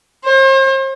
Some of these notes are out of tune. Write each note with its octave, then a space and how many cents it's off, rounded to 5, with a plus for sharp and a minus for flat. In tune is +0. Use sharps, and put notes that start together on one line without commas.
C5 +40